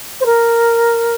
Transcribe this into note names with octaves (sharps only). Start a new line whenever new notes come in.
C5
A#4